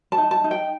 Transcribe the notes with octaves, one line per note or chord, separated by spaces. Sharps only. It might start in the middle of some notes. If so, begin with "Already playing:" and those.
A5
D#4
A5
D#4
G5